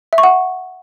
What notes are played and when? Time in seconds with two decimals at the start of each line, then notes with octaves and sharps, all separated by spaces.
0.13 E5
0.18 C#6
0.23 F#5